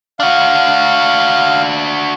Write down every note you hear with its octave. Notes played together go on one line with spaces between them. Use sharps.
D4 F#4 F5